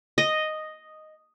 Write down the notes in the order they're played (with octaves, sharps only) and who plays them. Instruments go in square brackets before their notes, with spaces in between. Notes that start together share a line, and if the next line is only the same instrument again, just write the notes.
[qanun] D#5